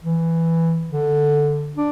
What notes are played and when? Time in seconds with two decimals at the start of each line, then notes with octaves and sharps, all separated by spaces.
0.04 E3
0.91 D3
1.77 D4